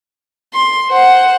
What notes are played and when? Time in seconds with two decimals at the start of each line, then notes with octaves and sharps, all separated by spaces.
0.54 C6
0.90 C5 F#5